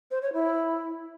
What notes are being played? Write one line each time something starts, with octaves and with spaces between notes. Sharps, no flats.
C5
C#5
E4